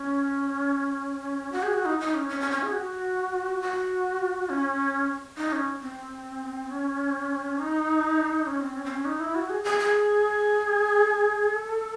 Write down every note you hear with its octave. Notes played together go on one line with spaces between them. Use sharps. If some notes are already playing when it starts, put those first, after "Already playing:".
Already playing: C#4
F#4
G#4
F#4
D#4
D#4
C#4
C#4
C#4
C#4
G#4
F#4
F#4
C#4
D#4
C#4
C4
C#4
D#4
C#4
C4
C#4
C4
C#4
D#4
E4
F#4
G#4
G#4
G#4
A4